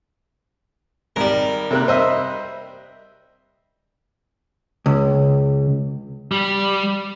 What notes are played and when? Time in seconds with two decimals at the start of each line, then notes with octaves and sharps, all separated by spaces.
1.16 G#1 G3 A#4
1.71 C3 A#3 F#6
1.88 C5 D#5 E5
4.86 C#2
6.32 G3